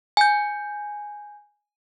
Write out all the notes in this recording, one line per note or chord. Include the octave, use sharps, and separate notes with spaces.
G#5 G6